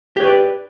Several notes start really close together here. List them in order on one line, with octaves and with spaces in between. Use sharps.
G4 C#5 B4 D5